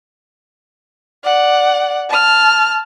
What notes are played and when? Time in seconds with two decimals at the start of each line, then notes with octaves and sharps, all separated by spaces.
1.24 D5 F#5
2.09 A5 F6